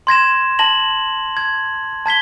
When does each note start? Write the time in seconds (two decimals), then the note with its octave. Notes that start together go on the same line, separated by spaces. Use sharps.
0.07 C6 G#6 A#6 E7
0.59 A5 A#6 F#7
1.37 G#6
2.06 A5 G#6 B6 G7